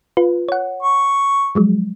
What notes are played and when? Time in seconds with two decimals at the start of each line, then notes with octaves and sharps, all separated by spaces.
0.17 F4 B4
0.49 C#5 F#5
0.82 C#6
1.55 F3 F#3 G#3